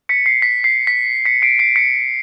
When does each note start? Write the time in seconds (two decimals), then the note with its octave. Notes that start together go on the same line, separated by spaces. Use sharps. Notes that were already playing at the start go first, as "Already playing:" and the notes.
0.09 B6 C#7
0.26 C7
0.42 B6
0.64 C7
0.87 B6
1.25 B6 C#7
1.42 C7 D7
1.59 C7 D7
1.76 B6 C#7